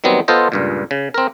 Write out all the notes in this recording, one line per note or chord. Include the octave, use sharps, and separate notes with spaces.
D#3 F#3 G3 B3 C4
B3 F4 A4 C5 D#5
C#2 G2 A#2
C#3
C4 A#4